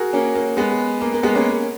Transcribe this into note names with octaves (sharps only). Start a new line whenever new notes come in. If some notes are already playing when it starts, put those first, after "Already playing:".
Already playing: F#4 G#4 A#4
A#3 C#4
A#3
G#3 B3
A#3
A#3
G#3 B3
A#3 C#4